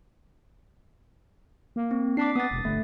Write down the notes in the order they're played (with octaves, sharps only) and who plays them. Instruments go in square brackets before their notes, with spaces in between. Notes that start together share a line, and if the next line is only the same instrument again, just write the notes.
[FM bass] A#3
[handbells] C4
[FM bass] D4 [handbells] D6 B6 C7
[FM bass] B3 [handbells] D#6 A6
[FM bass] E1
[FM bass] G1 [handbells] A3